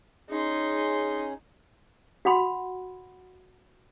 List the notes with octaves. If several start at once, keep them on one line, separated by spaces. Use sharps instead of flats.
C#4 D#4 G#4 C6
F#4 F#5 B5 C6